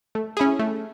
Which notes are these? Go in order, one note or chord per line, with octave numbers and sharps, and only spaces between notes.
A3
C#4 E4 G#4
A3